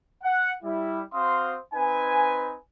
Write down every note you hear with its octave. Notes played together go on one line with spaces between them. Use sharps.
F#5
G3 E4
C4 F#4 C5 F5 C6 D#6
C4 D#4 B4 G#5